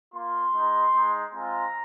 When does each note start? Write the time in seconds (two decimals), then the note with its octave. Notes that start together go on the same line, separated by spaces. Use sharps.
0.14 A#3 F4 C6
0.53 G#3 D#4
0.94 G#3 D#4
1.32 G#3 C4 F4 A#5